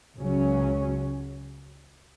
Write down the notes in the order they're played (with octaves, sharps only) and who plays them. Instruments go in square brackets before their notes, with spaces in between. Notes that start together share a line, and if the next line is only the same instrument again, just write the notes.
[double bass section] C#2 C#3 F#3 C#4